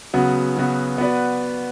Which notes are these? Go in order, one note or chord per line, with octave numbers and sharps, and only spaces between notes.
C#3 F#3 B3 F#4
C#3 F#3 B3 F#4
B3 F#4 B4 D5